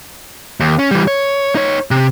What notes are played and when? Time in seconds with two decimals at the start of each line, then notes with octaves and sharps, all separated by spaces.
0.60 D#2
0.79 C#4
0.91 E3 G3
1.08 C#5
1.55 D#4 C#5
1.91 C3